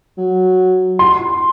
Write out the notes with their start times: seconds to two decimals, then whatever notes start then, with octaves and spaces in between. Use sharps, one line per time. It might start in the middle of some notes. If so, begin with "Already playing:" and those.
0.18 F#3
0.99 C6